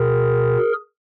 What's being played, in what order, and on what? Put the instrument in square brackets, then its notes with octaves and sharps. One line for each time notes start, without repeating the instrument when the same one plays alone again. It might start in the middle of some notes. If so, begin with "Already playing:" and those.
Already playing: [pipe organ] B2 G#4 A#4